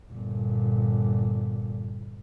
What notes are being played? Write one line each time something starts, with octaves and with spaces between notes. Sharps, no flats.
G1 A#2